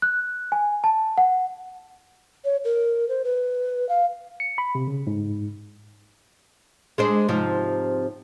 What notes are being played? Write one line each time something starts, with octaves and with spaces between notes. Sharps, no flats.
F#6
G#5
A5
F#5
C#5
A#4
C5
B4
F5
C#7
B5
C3
C#3
G#2
G#3 D4 C5
G#2 C3 F3